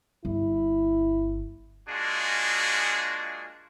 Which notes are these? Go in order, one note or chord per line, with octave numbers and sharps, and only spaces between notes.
G1 E4
G#3 A#3 D4 F4 F#4 G#4